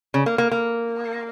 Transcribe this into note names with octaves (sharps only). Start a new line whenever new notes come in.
C#3
A#3
A#3
A#3